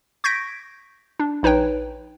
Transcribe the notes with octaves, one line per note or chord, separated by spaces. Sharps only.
C#6 G6 G#6 A#6 B6 D7
D4
A#1 D#4 B4 C#5 G5